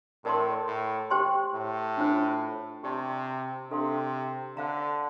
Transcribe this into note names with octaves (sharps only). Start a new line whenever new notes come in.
A2 A#4 D5 A5 C6
A2
G4 C5 G5 C6
A2
D4 F4 C5
C3 G4 D5 A5 C6
C3 D4 A4 D5 F5 C6
D3 C5 F5 A#5